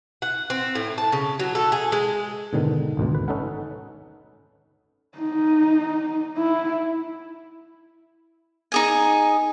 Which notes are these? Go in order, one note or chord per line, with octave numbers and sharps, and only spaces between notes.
F#5
C4
A2
A5
C#3
F#3
A4
G#4
G#3
G#2 B2 D3 D#3
G#1 D2 B2
B4
C#4 D#4 A4 B4 F#5
D#4
E4
D#4 G#4 G#5